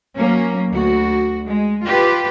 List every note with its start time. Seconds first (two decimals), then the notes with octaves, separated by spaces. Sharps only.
0.18 F#3 A#3 C#4
0.70 D2 F#4
1.46 G#3
1.85 F4 G4 B4